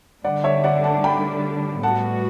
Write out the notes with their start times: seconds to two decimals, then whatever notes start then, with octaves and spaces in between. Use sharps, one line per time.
0.24 D3 G3 D4 D5 F#5
0.44 C#5 E5
0.64 D5 F#5
0.84 F#5 A5
1.04 G5 B5
1.83 A2 G3 B3 F#4 F#5 A5